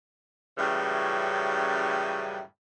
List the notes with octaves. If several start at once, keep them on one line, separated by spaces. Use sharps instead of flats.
F#2 A2 C#3 E3 G3